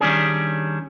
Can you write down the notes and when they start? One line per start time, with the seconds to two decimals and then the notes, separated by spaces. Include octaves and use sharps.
0.01 D#3 G3 C#4 D4 G#4